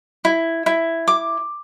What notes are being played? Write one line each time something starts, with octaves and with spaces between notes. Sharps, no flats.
E4
E4
D6